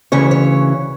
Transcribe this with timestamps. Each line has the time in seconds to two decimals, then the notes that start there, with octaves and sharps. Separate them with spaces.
0.12 D2 C#3 E3 C#5
0.31 C#5